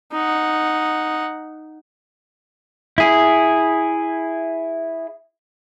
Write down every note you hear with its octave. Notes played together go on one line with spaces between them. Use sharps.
D#4 F#5
E4 G#4